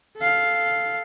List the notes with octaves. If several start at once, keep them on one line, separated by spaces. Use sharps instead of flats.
A4 F5